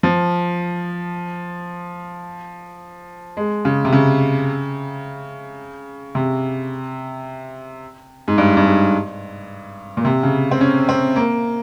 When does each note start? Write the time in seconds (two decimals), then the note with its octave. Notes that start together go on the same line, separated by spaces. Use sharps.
0.03 F3
3.37 G#3
3.65 C#3
3.85 C3
3.92 C#3
6.15 C3
8.28 G#2
8.38 G2
8.57 G2
8.66 G#2
9.97 A#2
10.05 C3
10.23 C#3
10.51 C4
10.61 C#4
10.89 C4
11.16 A#3